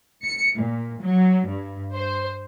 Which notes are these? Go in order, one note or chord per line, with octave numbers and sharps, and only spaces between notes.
C#7
A#2
F#3
G2
C5